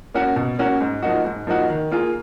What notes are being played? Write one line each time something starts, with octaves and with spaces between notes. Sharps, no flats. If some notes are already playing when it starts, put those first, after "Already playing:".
A#3 C#4 F#4
B2
A#3 C#4 F#4
G#2
F3 A#3 D#4 F#4
G#2
F3 A#3 D#4 F#4
D#3
A#3 F4 G#4